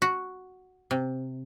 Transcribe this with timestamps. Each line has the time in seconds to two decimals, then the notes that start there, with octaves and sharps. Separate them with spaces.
0.02 F#4
0.91 C3